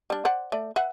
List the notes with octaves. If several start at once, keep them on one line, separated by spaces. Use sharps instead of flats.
G3 D4
C5 D5 F#5
A3 D5
B4 E5 F#5